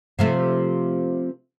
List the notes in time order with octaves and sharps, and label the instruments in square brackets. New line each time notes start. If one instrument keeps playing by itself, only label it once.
[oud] C3 F3 A3